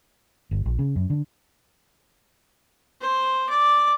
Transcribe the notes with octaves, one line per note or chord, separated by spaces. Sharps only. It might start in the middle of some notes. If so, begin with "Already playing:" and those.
G1
A#1
C#3
F#2
D3
C5
D5